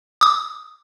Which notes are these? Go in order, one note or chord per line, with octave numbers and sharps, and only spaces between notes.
D6 D#6